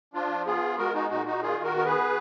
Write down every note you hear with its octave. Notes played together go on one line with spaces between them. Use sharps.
F3 D4 F4
B3 F4 G#4
G#3 F#4 A#4
D#4 F#4
A#2 D#4 F#4
D#4 F#4
D#3 F4 G#4
F#4 A#4
B3 A#4
G#4 B4